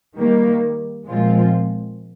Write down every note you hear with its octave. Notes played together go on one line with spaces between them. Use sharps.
D#3 G3 A#3
A#2 F3 G#3 C4 F4